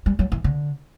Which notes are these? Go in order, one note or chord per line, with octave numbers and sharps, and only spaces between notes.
G3
F#3
E3
D3